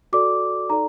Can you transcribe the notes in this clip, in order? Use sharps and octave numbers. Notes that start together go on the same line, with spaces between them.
F#4 A4 D5 D6
D#4 A4 D5 A#5